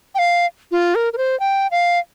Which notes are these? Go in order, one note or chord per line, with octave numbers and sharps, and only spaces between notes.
G5
F5
F4
A#4
A#4
C5
G5
F5